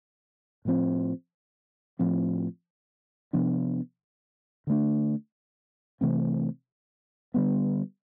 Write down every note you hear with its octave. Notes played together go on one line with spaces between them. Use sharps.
A2 F3 C4
A2 F3 C4
C3 F3 B3 D4
D3 A3 D4
C3 E3 A3 C4
D3 G3 B3